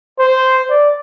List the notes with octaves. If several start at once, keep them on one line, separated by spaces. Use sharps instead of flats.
C5
D5